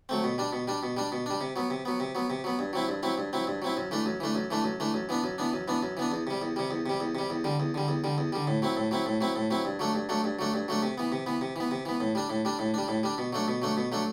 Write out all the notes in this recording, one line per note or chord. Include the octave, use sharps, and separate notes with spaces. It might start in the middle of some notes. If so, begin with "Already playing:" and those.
F#3 A3 C4
B2
G3 D4
B2
G3 D4
B2
G3 D4
B2
G3 D4
C3
F#3 B3
C3
F#3 B3
C3
F#3 B3
C3
F#3 B3
G2
F#3 C4 E4
G2
F#3 C4 E4
G2
F#3 C4 E4
G2
F#3 C4 E4
F#2
E3 A3 D4
F#2
E3 A3 D4
F#2
E3 A3 D4
F#2
E3 A3 D4
F#2
E3 B3 D4
F#2
E3 B3 D4
F#2
E3 B3 D4
F#2
E3 B3 D4
E2
C3 G3
E2
C3 G3
E2
C3 G3
E2
C3 G3
E2
D3 G3
E2
D3 G3
E2
D3 G3
E2
D3 G3
A2
F#3 C4 E4
A2
F#3 C4 E4
A2
F#3 C4 E4
A2
F#3 C4 E4
G2
F#3 A3 D4
G2
F#3 A3 D4
G2
F#3 A3 D4
G2
F#3 A3 D4
C3
E3 B3
C3
E3 B3
C3
E3 B3
C3
E3 B3
A2
G3 D4
A2
G3 D4
A2
G3 D4
A2
G3 D4
B2
F#3 A3 D4
B2
F#3 A3 D4
B2
F#3 A3 D4